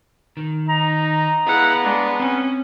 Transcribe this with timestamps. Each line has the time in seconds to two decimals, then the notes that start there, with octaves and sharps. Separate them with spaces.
0.37 D#3
0.69 D#4 A#5
1.47 B3 E4 G#4 D#5 F5 F#5
1.83 G#3 D4
2.20 C4 C#4